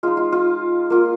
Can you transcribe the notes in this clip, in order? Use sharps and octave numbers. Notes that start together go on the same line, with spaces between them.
G#3 D#4 F4
F4
F4
A#3 F4